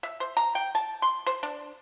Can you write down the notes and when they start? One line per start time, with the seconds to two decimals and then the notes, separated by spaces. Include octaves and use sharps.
0.03 E5
0.20 C5
0.37 A#5
0.55 G5
0.75 A5
1.02 C6
1.27 C5
1.43 D4